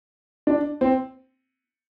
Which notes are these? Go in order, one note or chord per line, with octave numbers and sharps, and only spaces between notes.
D4
C4